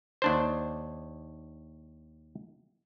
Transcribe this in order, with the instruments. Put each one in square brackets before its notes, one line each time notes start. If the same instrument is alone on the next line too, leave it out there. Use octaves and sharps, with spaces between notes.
[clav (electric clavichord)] D#2 D4 C5